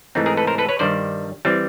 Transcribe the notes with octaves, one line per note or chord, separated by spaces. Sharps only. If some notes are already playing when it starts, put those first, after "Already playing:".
G#2 E3 A3 C4 D#4
G#4 A#4
A4 B4
A#4 C5
A4 B4
B4 C#5
G2 D#3 G3 C5 D5
E3 G3 C4